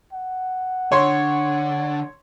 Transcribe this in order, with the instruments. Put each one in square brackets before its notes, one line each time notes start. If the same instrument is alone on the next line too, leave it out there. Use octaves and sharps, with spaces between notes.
[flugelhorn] F#5
[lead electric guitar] D3 [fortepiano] C#5 C6